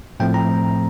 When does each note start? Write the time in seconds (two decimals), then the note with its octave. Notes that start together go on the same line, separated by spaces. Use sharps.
0.20 A2 F3 A3 C4 G5
0.34 A#5